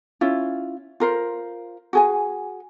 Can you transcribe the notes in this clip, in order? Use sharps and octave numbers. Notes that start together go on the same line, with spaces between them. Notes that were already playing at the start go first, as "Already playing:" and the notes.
C#4 E4 F4
F4 A#4 C5
F#4 G#4 G#5